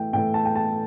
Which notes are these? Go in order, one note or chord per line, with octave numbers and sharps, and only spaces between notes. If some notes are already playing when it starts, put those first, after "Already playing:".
Already playing: A2 E3 A3 G5
A2 E3 A3 G5
A5
G5
A5